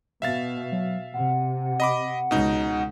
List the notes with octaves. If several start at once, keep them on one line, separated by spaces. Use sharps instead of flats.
B2 E5 F5 A6
F#3
C3 F#5
D#5 B5 D6
C#2 B2 D#4